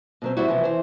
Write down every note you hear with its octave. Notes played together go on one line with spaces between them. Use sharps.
B2 F#3 C4
G3 C4 E4 F#4
C3 E3 F3
E3 C5